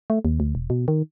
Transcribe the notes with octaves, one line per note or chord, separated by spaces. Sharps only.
A3
D#2
D2
E1
B2
D#3